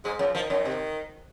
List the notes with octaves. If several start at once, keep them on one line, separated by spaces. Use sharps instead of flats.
G#2 G#3
F#2 F3
D#3 F3
F#2 D#3
C3